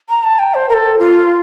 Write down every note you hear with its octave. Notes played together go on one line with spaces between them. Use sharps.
A#5
A5
G5
C5
A#4
A4
F4